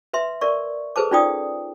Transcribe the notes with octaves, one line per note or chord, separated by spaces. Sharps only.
B4 E5 C6
A#4 D5 C#6
G#4 A4 B4 C5 A5 D6
C#4 D#4 F4 D5 G5 D#6